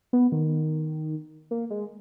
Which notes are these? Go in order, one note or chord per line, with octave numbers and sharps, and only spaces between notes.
B3
D#3
A#3
G#3